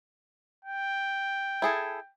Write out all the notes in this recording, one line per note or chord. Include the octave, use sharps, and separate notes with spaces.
G5
E4 G#4 A4